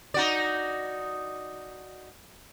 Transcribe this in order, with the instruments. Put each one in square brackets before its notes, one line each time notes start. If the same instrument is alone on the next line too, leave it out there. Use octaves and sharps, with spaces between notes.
[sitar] D#4 F#4 D5